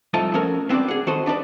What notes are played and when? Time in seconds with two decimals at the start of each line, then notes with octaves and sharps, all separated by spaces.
0.14 C2 F3 A3 D#4 A5
0.34 F3 C#4 F#4 A4 A#4
0.69 B3 C4 D4 F#4 D5
0.88 G#4 F#5
1.07 D#3 F#4 A4 C5 D#5
1.26 B3 D4 D#4 B4 D5